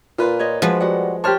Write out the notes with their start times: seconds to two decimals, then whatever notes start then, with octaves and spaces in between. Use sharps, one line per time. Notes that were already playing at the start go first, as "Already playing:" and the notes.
0.18 A#2 F4 B4
0.39 C#5 D#5
0.62 F3 G#3 F#4 B4
0.80 G3 F#4 F#5
1.24 G4 C5 C#5 A5 F6